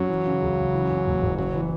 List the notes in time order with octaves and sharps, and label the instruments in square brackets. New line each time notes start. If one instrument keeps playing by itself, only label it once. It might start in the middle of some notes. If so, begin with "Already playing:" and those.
Already playing: [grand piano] F#2 [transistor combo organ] F#3
[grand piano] E3
C#3
C#2
C#2
E3
F#2
F#1
F#1
[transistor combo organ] F#3 [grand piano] C#4
[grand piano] E3